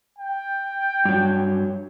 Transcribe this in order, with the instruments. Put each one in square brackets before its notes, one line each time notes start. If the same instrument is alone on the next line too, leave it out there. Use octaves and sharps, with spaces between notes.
[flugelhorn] G5
[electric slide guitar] G2 F#3